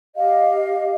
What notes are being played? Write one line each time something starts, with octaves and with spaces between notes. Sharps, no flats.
G4 D#5 F5